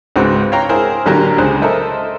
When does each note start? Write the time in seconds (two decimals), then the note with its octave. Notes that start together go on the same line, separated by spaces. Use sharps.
0.16 C#2 G#2 C4 F#4 B4
0.52 C#5 F5 G5 A#5 C#6
0.69 E4 G#4 A#4 C5
1.06 A1 D3 F#3 A#3 G4 A#5
1.38 C#2 G#4 C5 F#6
1.62 A4 A#4 C5 D#5 E5